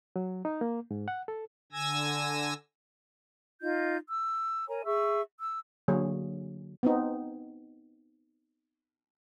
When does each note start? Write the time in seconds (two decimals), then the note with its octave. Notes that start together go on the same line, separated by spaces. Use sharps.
0.16 F#3
0.45 D#4
0.61 A#3
0.91 G#2
1.08 F#5
1.28 A4
1.72 D3 G#5 E6 G#6 A#6
3.61 D#4 F4 D#5 G6
4.09 E6
4.68 A#4 C#5 G#5 A#5
4.84 G#4 E5 C#6 E6
5.40 E6
5.88 D3 F#3 A#3 G#4 C#5
6.83 B3 C4 D#4